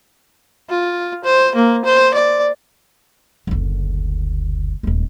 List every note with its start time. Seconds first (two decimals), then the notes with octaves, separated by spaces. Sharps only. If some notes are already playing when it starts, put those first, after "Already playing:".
0.69 F4
1.24 C5
1.55 A#3
1.85 C5
2.14 D5
3.47 F#1 D2
4.83 D#1 G#3